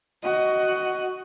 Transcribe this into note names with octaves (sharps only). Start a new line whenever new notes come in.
F#4 D#5